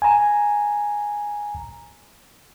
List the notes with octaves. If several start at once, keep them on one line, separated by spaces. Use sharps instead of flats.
G#5 A#5